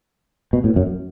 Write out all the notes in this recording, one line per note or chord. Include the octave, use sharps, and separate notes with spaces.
B2
A2
F#2